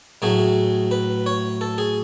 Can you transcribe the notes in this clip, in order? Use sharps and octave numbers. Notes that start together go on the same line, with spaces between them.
A2 F#3 A3 G#4
B4
C#5
A4
G#4